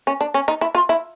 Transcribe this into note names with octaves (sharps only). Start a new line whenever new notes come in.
C#4
D4
C#4
D#4
E4
F4
E4